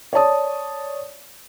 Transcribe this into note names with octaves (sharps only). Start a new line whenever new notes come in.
C#5 D5 A5 D#6